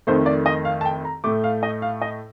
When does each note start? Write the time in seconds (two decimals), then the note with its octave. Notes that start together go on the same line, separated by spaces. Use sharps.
0.07 F2 D#3 A3 C5
0.26 D5
0.46 D#5
0.65 F5
0.81 A5
0.85 G5
1.05 A#5
1.24 A2 A3 D6
1.44 F5
1.63 D#5
1.82 F5
2.02 D#5